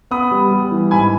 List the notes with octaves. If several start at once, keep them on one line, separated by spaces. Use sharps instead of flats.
B3 B5 D#6
G3
G3
E3
G#2 G#5 B5